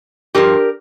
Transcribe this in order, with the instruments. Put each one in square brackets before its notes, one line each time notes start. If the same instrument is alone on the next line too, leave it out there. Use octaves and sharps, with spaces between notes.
[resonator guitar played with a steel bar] G2 F3 G4 A#4